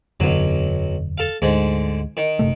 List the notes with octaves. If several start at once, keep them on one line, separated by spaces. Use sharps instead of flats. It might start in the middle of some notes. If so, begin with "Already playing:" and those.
E1 B1 F#2 D3 F#3
A4 F5
D2 G#2 D3
D#3
F#1 C3 A3